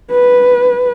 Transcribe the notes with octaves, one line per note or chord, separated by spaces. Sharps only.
B4